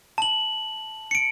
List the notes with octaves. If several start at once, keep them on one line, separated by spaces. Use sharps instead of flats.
A5 F#7
C#7 D7